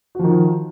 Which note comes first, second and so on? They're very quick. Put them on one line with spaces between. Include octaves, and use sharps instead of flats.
F#4 F3 D#3